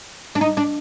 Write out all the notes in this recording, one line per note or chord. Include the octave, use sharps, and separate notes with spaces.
D4
D#4
D4